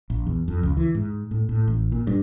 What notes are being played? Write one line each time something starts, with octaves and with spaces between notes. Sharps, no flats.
A#1
E2
F2
C#2
E3
G#2
A2
A2
A1
A#2
G2